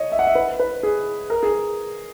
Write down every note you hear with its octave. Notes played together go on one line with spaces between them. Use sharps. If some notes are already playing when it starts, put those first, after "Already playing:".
Already playing: C#5 D#5
E5
F#5
E5
B4
B4
G#4
A#4
G#4